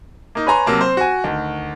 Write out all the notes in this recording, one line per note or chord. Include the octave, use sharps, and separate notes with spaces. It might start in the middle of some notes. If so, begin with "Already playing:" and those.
A#3 D#4
B4 C#5 G#5 A#5 C6
C3 F#3 A#3 A5
C4 C5
F#4 G#5
D2 D#3